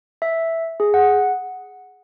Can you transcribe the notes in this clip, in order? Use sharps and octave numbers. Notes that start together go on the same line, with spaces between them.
E5
G#4
F#5